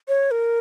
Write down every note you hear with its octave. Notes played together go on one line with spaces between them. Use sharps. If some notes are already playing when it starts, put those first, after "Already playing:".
C#5
A#4